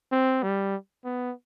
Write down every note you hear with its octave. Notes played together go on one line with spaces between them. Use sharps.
C4
G3
B3